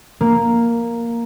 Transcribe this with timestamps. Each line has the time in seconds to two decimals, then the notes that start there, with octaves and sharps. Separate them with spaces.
0.21 A#3